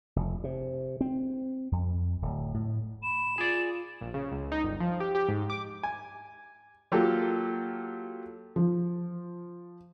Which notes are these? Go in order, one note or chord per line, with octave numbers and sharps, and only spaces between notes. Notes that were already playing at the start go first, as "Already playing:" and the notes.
F1
C3
C4
F2
D1
A2
B5 E7
F4 G#4 D5
A#1
C#3
C#2
D#4
G1
F3
G4
G4
G#2
D6
G#5
F#3 A#3 F4 G4 A4
F3